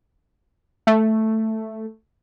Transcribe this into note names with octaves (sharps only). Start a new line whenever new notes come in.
A3